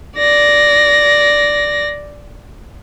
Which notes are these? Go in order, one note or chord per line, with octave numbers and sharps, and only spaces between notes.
D5 A#6